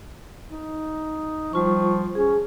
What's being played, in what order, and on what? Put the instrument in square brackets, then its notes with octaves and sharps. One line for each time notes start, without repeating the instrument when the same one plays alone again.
[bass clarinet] D#4
[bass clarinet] F3 [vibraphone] G3 F4 C#6
[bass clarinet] C#4 [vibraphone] G#4